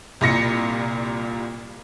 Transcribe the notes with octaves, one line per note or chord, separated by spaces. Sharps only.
C2 A#2 A#6 C#7